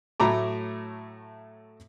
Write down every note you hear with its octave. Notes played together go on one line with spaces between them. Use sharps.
A2 F#3 A3 A#5 B5 D6